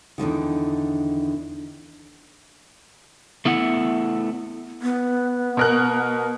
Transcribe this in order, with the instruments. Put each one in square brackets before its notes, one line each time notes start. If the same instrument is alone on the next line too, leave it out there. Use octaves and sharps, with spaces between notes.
[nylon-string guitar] E2 G2 D3 D#3
[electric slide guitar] A3 B3 E4 F#5
[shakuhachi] B3
[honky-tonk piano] B2 A#4 F#6